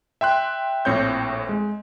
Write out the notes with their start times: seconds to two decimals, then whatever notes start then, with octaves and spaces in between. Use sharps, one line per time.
0.21 E5 G5 C6 F#6
0.85 A#1 A2 C4 C#5 G6
1.49 G#3